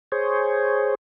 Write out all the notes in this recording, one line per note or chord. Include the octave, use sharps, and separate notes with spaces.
G#4 C5 C#5